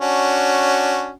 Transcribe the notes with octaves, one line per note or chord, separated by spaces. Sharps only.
C#4 D4 F#4